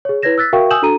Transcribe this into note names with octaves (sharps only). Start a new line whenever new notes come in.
G#4 C#5
E4 B4 C#5 G#6 A#6 E7
E6 F#6 A6 B6
F#4 A#4 E5 F5 G5 C#6
G#5 D#6 E6 G6 E7 F#7
D4 F#4 A4 A#5 D#7